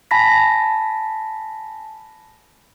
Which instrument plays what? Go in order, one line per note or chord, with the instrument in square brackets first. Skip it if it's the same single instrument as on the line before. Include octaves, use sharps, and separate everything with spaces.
[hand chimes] G#5 A5 B5 A#6 B6